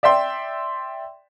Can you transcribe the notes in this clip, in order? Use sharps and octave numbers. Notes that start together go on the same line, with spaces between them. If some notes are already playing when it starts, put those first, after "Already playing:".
D5 E5 G5 C6